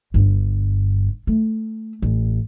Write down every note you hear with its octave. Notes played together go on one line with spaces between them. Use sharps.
G1 G2
A3
A1